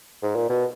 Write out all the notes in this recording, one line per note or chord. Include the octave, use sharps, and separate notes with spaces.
G#2
A#2
B2